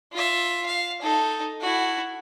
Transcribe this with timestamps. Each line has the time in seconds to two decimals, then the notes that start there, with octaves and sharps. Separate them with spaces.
0.13 F4 E5
0.66 F5
1.02 D#4 A4
1.61 E4 F#4